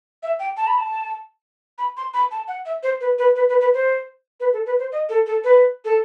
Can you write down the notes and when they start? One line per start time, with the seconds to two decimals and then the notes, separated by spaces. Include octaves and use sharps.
0.23 E5
0.39 G5
0.57 A5
0.67 B5
0.78 A5
1.78 B5
1.97 C6
2.14 B5
2.31 A5
2.48 F#5
2.66 E5
2.83 C5
3.01 B4
3.18 B4
3.35 B4
3.49 B4
3.61 B4
3.74 C5
4.40 B4
4.53 A4
4.66 B4
4.79 C5
4.92 D#5
5.09 A4
5.26 A4
5.44 B4
5.85 A4